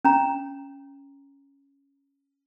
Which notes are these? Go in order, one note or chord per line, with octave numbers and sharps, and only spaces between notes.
C#4 A#5